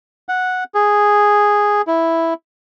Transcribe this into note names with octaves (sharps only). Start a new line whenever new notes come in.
F#5
G#4
E4